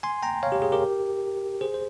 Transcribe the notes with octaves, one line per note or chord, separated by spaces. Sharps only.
G#5 C6
G5 A#5
C#5 F5
G4
G#4
G4 A#4
G#4 C5
C5